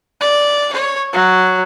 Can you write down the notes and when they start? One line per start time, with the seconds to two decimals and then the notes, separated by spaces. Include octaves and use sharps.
0.21 D5
0.73 C#5
1.13 F#3